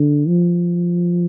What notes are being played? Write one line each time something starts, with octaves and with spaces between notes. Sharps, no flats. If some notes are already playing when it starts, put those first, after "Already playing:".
Already playing: D3
F3